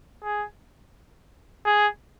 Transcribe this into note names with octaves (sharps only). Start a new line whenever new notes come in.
G#4
G#4